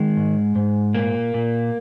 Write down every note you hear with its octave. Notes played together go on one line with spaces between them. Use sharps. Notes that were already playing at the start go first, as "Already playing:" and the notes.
Already playing: D#3 G#3
G#2
G#2
A#2 A#3
A#2